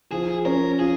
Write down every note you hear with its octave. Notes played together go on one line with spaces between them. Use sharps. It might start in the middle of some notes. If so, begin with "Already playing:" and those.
F3 G#4
C#4 A#4
F4 G#4